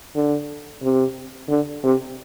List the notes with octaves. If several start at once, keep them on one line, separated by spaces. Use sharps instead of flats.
D3
C3
D3
C3